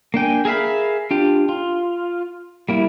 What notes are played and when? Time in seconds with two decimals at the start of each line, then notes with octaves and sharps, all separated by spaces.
0.14 A#3 D4 G5 G#5
0.45 G#4 A#4 E5 F5 B5
1.11 D4 F4 G4
1.49 F4
2.69 G3 A#3 E4